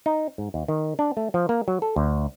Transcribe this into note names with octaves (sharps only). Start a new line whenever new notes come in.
D#4
G#2
D#2
D#3
D4
A3
F3
A#3
F#3
A4
D2